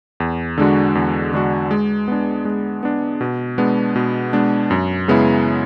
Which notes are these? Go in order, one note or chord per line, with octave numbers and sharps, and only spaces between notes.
E2
D3 G#3 D4 F#4
E2
D3 G#3 D4 F#4
G#3
B3 D4
G#3
B3 D4
B2
G#3 B3 D4
B2
G#3 B3 D4
F#2
C#3 G#3 B3 E4